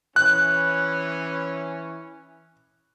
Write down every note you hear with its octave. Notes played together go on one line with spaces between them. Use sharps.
E3 C#4 F#6